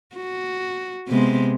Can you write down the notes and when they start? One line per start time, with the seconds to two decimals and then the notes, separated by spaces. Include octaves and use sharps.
0.16 F#4
1.09 C3 G#3 B3